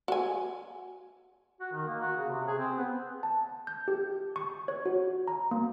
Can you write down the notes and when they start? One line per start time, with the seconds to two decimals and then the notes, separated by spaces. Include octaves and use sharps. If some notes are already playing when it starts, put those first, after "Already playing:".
0.08 F#4 G#5
1.60 F#4
1.72 D#3
1.87 A#3
2.00 F#4
2.17 C#3
2.29 C3
2.47 G#4
2.59 C4
2.77 B3
3.23 A5
3.67 G6
3.88 G4
4.36 C#6
4.68 C#5
4.86 F#4
5.28 A#5
5.51 A#3